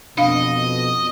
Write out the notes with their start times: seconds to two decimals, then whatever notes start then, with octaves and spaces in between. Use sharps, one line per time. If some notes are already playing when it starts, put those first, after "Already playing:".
0.18 F2 B2 D4 D#5 F5